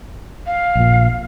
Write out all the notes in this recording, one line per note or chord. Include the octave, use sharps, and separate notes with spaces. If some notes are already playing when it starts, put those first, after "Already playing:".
F5
A#1 A#2